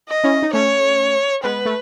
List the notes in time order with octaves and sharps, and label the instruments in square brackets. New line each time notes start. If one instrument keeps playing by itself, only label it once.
[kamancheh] D#5
[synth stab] C#4 E4
D#4
[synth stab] A3 C#4 [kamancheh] C#5
[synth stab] G#3 B3 [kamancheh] B4
[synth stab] A3